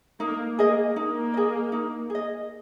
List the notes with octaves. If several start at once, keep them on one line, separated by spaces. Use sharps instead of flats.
A#3 D#4
A#3 G#4 D#5
A#3 D#4
G#4 D#5
D#4
G#4 D#5